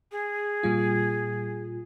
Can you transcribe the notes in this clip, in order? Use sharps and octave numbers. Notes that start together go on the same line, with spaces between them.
G#4
A#2 G3 F4